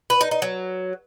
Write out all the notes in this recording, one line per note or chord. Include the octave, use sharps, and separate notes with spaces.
B4
D#4
D#4
F#3